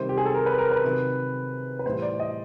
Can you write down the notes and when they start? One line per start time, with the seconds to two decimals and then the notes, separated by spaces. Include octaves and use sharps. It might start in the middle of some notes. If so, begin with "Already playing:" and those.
Already playing: C3 D#3 G3 C5
0.09 G4
0.18 G#4
0.26 A4
0.34 A#4
0.46 B4
0.58 A#4
0.71 B4
0.84 C3 D#3 F#3
1.79 B4
1.86 A2 E3 G3 C5
2.02 D5
2.20 D#5